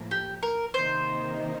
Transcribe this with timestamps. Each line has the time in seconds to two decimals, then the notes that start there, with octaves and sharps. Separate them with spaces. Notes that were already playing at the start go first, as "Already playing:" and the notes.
Already playing: A2 F3 A#3
0.11 G4
0.43 A#4
0.74 C3 D#3 A#3 D#4 C5